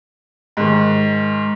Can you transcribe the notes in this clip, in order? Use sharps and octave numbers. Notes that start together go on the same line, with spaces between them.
G#2 D#3